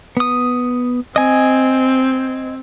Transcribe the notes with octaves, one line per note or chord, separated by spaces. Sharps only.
B3 D#6
C4 D#5 G#5